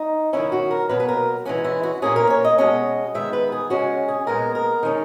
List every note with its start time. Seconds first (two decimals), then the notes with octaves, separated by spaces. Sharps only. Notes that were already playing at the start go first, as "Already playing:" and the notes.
Already playing: D#4
0.33 D#3 F#3 C#4 E4
0.52 F#4
0.71 A#4
0.89 B2 F#3 A#3 B4
1.00 B4
1.09 A#4
1.45 E3 G#3 C#4 F#4
1.64 E4
1.83 F#4
2.02 A#2 A#3 C#4 G#4
2.16 A#4
2.30 C#5
2.45 D#5
2.58 B2 G#3 C#4 D#5
3.14 D#3 G#3 B3 E5
3.33 B4
3.52 G#4
3.70 C#3 G#3 C#4 F#4
4.08 G#4
4.27 A#2 G#3 B3 A#4
4.55 A#4
4.83 D#3 G#3 C#4